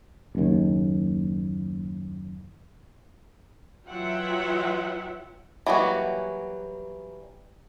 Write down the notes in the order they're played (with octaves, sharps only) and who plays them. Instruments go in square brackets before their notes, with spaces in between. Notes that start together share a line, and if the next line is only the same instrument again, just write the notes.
[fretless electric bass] F#1 D#2
[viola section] E3 F#3 F4 E5 F#5 G5
[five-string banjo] E3 F#3 G3 A#3 F#4